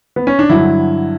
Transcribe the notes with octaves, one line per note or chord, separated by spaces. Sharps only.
B3
C#4
D4
G2 D3 F#3 E4